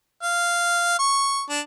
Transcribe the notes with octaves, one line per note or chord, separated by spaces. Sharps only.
F5
C#6
D4